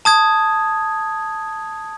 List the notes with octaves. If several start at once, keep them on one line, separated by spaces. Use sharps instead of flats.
A5 D#6 G#6